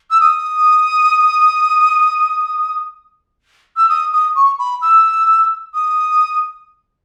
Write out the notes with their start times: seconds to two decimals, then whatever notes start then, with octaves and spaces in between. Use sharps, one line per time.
0.11 E6
0.20 D#6
3.76 E6
3.89 D#6
4.12 D#6
4.35 C#6
4.59 B5
4.82 E6
5.74 D#6